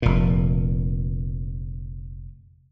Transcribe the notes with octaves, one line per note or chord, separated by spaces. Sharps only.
F1 A#2